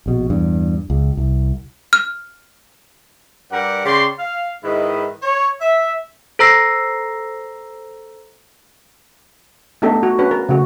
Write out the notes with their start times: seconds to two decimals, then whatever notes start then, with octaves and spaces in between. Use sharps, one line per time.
0.06 A#1 B2
0.30 E2 G2
0.90 C#2
1.17 C2
1.93 F6
3.52 G2 G3 G4 A#4 F#5
3.85 C#3 D5 G5 C6
4.19 F5
4.64 G#2 D#3 E4 B4 D#5
5.23 C#5
5.61 E5
6.39 A4 C5 A#5 E6 A#6 C7
9.82 A3 B3 D4 D#4 G4 A4
10.03 F#4
10.18 C#4 D4 F#4 B4
10.31 A#4
10.49 C#3 A3 F#4